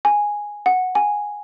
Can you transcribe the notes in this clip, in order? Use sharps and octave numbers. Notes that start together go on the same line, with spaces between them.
G#5
F#5
G#5